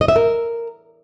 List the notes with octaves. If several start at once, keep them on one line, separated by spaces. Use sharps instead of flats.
D#5
E5
A#4